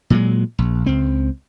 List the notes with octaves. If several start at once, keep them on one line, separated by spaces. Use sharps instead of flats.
A#2 F#3 G#3
A#1
C#2 C4